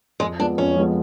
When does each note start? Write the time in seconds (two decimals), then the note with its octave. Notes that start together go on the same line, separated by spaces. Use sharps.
0.20 F2 G#3
0.39 F3 G#3 B3 D4
0.58 F2 C#4
0.76 F3 G#3 B3